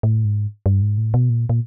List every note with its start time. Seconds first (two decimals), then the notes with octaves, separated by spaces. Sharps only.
0.03 A2
0.25 G#2
0.66 G2
0.82 G#2
0.97 A2
1.14 B2
1.30 A#2
1.49 A#2